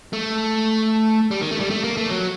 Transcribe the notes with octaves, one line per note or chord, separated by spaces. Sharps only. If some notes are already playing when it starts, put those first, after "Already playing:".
A3
G3
D#3
A3
G3
A3
A#3
A3
F#3